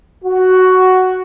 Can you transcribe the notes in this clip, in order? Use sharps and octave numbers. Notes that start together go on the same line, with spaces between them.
F#4